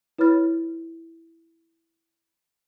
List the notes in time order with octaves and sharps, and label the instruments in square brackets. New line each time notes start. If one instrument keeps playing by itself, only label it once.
[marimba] E4 B4 C#5 B5 F6 A6